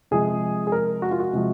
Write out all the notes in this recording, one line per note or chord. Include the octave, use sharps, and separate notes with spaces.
C3 F3 G#3 G#4
G#4
A#4
F#4
F4
F#4
C3 F3 G#3